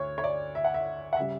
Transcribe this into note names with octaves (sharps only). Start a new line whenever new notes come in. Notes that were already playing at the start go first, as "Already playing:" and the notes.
Already playing: D2 C#5
C#5
D5
E5
F#5
E5
F#5
C#3 G3 E5